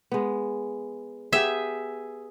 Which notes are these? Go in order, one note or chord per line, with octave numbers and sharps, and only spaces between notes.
G#3 B3
B3 G4 G#4 E5